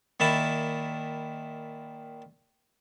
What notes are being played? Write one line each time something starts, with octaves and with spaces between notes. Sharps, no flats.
A#2 D#3 E4 A5 B5